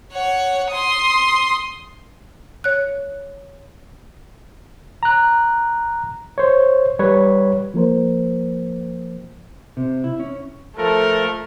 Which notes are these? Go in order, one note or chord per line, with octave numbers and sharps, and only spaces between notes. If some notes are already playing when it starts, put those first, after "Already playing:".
C#5 F#5
C6 D#6
C#5 F#6
A#5 F#6
C5 C#5
G3 B4 C#5
F3 A#3 A#4 C5
C3
E4
C#4
F3 A3 A4 A#4